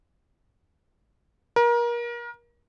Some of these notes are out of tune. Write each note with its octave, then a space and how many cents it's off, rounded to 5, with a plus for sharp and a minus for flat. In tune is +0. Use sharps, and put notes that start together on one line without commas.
A#4 +30